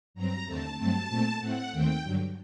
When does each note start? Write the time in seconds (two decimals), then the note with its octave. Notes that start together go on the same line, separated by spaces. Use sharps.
0.14 G2 F#3 C4 A#5
0.46 D#2 D3 A3 C4 A5
0.77 G2 F#3 A3 C4 A5
1.08 A#2 A3 C4
1.40 A2 A3 C4 F#5
1.71 D#2 D#3 A3 C4 G5
2.03 G2 D3 F#3